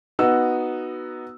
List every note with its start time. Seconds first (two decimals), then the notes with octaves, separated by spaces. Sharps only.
0.19 B3 D#4 F#4 E6